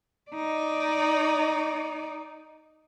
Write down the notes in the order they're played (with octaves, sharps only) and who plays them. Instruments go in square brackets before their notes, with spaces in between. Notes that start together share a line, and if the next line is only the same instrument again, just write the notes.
[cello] D#4 D5